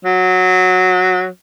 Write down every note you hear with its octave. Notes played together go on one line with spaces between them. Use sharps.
F#3